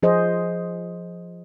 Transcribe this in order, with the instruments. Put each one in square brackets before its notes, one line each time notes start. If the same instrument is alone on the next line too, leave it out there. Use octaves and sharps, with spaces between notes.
[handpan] F3 G#4 C5 D#5